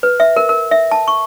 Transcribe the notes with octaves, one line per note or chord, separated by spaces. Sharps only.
B4
E5
A#4
A#4
E5
A5
C#6